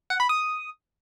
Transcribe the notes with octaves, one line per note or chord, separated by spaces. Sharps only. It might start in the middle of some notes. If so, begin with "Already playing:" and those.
F#5
B5
D#6